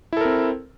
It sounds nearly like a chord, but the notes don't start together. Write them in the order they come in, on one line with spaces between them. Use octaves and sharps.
E4 A4 A#4 C4